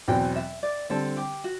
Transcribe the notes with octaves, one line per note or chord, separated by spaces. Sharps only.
E2 B2 F#3 C4 G5
E5
D5
D3 G3 C4 A4
G4
F#4